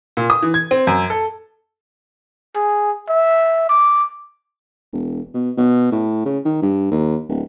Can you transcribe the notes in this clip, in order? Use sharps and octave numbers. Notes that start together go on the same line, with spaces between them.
A#2
D#6
E3
G#6
C4
F#2
A4
G#4
E5
D6
E1
B2
B2
A2
C#3
D#3
G2
D#2
D1